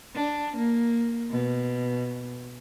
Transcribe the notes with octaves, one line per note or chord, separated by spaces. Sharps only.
D4
A#3
B2